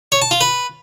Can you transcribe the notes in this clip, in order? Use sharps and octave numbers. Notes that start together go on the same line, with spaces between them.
C#5
A5
F4
B4